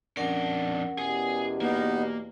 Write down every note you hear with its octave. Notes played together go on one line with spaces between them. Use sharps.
F2 C#4 D4 A#4 F#5
E2 B2 G4 G#4 G#5
A#3 B3 D#4